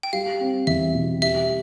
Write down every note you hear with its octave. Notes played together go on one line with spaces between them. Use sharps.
G5
G3 F5
C4
E2 E5
B2
G3 E5